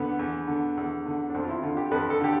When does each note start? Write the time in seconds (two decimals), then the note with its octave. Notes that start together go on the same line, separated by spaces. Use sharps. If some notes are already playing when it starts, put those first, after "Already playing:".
Already playing: E2 D3 B3
0.19 E2
0.48 D3
0.77 E2
1.06 D3
1.30 D4
1.34 F2 C4
1.44 F4
1.49 E4
1.63 D3 F4
1.77 G4
1.91 F2 B4
2.10 A4
2.20 D3 G4